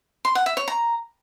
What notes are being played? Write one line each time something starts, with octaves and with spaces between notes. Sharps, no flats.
C6
F#5
E5
C#5
A#5